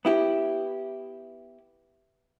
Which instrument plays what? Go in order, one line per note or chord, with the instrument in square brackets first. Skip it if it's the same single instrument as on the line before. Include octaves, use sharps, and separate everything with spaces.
[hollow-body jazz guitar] B3 E4 G4